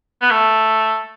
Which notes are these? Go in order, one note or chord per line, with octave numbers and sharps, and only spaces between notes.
B3
A3